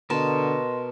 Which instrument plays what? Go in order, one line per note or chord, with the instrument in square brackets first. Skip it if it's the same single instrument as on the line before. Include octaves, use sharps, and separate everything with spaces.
[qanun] B2 [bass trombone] D3 [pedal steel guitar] A#4 A5 [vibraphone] D#5 C6